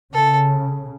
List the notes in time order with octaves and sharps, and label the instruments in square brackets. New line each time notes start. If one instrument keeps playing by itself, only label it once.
[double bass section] C#3 [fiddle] A4